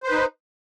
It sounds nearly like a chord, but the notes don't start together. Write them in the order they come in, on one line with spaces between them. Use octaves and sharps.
C5 B4 D#4